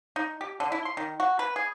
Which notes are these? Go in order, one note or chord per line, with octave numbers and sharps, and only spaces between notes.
D#4
G4
D3
E4
C6
D#3
F#4
B4
G#4